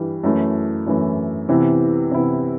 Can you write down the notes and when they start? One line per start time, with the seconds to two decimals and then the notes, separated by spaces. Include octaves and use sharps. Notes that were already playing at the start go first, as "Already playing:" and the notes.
Already playing: G2 E3 G3
0.24 F#2 E3 A3 E4
0.86 F#2 E3 A3 E4
1.49 C3 E3 B3 E4
2.12 C3 E3 B3 E4